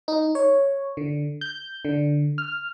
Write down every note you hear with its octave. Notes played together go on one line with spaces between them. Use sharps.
D#4
C#5
D3
G6
D3
F6